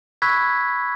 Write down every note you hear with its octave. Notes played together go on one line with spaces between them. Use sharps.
B5 C#6 E6 F#6 G#6 B6